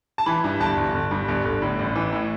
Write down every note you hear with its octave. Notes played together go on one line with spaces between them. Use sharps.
A5
E3 B5
G2
G1 A5
G1
G1
G2
G1
G1
A2
A1
E3
A2